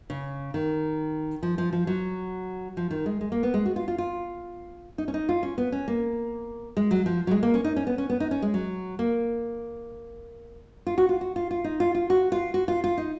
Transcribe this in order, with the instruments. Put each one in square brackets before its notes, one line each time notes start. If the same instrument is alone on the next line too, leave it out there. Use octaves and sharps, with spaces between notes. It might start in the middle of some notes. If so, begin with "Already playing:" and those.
[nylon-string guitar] C#3
D#3
F3
F3
F3
F#3
F3
D#3
G#3
G#3
A#3
B3
G#3
F#4
F4
F4
F4
D#4
C#4
D#4
F4
C#4
B3
C#4
A#3
G#3
F#3
F3
F#3
G#3
A#3
C#4
D#4
C#4
B3
C#4
B3
D#4
C#4
G#3
F#3
A#3
F4
F#4
F4
F#4
F4
F4
D#4
F4
F4
F#4
F4
F#4
F4
F4
D#4